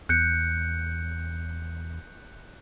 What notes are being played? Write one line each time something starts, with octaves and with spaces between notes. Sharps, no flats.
E2 F#6 G6 C#7